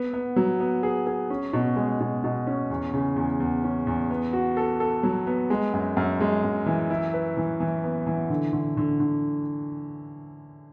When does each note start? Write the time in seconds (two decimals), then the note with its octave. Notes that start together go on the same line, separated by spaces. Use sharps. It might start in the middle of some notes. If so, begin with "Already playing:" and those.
Already playing: B3
0.13 B3
0.36 F#3
0.60 B3
0.83 G#4
1.07 G#4
1.30 C#4
1.53 B2
1.76 G#3
2.00 B2
2.24 B2
2.47 C#4
2.70 E2
2.94 C#3
3.16 E2
3.40 E2
3.64 C#4
3.87 E2
4.10 B3
4.33 F#4
4.57 A4
4.80 A4
5.03 F#3
5.27 B3
5.50 G#3
5.73 F#2
5.97 F#2
6.21 G#3
6.44 F#2
6.66 E3
6.90 E4
7.13 B4
7.37 E3
7.60 E3
7.84 B3
8.06 E3
8.30 D3
8.53 D3
8.77 D3
9.00 D3